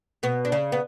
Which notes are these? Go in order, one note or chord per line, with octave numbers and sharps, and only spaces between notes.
B2 B3
D4
C#3 C#4
B3